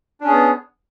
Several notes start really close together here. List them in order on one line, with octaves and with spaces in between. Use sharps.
D4 C#4 G#4 B3